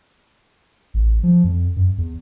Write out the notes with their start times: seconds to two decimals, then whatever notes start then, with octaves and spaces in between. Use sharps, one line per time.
0.94 A1
1.23 F3
1.44 F2
1.76 F#2
1.98 E2